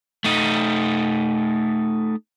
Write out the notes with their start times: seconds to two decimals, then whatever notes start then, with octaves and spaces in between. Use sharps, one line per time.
0.24 A3 D#4